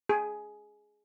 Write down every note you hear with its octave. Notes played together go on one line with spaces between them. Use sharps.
G#4